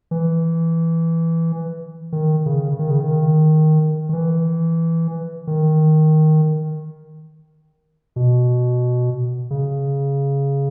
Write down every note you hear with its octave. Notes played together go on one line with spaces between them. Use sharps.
E3
D#3
C#3
D#3
C#3
D#3
D#3
E3
D#3
B2
C#3